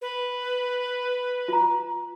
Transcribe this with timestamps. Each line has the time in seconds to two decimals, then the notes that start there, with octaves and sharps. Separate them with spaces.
0.02 B4
1.48 F4 A#5